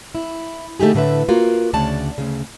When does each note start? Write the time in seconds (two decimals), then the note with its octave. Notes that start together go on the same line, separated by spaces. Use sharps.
0.15 E4
0.80 D3 A3 D#4 G4 G#4
0.94 A2 D3 A3 B4 E5
1.28 A#3 F4 F#4 A#4
1.73 D2 C#3 D5 F#5 A5
2.18 D2 C#3